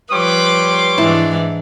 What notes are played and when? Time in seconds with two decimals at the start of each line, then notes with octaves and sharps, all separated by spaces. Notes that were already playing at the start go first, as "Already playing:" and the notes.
0.12 F3 G3 B4 C#5 C6 D6
0.98 G#2 E3 D4 E4 A5